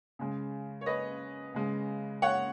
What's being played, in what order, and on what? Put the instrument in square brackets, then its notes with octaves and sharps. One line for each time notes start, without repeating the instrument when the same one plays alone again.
[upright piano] C#3 G#3
C#5
B4 D#5
C#3 G#3
C#5 F#5